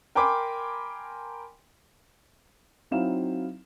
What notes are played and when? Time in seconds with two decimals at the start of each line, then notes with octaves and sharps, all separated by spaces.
0.15 A#4 G5 G#5 B5 C6 D6
2.91 F#3 C4 D#4 E4 F5 E7